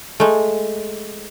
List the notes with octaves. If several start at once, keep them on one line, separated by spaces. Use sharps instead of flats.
G#3 A3